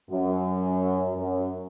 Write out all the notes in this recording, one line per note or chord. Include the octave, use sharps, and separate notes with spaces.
F#2
F#2